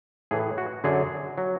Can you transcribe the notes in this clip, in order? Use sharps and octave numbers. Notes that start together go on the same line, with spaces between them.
A2 E3 G#4
F#4
F#2 D3 F#3 G#4
F#3